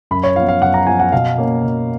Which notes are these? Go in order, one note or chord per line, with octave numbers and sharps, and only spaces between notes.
F#2 B5
C#5
F3 B3 F5
F5
F#2 F#5
A#5
F3 B3 G#5
F#5
B2 F5
A#3 C#4
B2